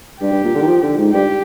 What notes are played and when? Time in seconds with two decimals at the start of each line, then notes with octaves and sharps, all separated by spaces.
0.21 G2 G4
0.33 G2
0.44 A#2
0.55 D3
0.62 D#3
0.67 F3
0.82 D3
0.97 G#2
1.13 G2 G4